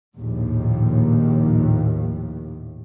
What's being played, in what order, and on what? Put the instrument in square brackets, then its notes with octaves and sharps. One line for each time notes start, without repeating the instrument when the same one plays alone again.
[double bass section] A#1 D#2 A2